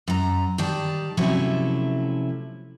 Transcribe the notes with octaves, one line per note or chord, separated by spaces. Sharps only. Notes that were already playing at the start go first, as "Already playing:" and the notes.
F#2 A#5
D#3 G3 D5 A5
C3 F3 F#3 A3 C#4 E4